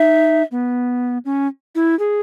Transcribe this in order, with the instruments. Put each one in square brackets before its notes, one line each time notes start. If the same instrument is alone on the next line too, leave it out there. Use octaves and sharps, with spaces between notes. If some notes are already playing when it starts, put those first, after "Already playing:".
Already playing: [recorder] D#4 [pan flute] E5
[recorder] B3
C#4
E4
G#4